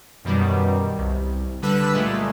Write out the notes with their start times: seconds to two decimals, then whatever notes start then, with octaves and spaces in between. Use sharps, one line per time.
0.25 F#2 B2 D#3 G3
0.97 C2
1.62 D3 G3 D4 B4 E6 F#6
1.94 A#2 G#3 A3